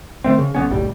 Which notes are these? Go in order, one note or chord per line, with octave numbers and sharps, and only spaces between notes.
D#3 E3 A3 C4
C#3
B1 B3 C#4
F#1 B1 A2 G3